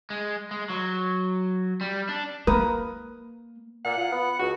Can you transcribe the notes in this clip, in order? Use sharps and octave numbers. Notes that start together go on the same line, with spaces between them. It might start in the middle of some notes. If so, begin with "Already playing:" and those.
G#3
G#3
F#3
G3
D4
A#3 A#4 B4 D#6
A#2 F#5
F4
B3
C#2 F#4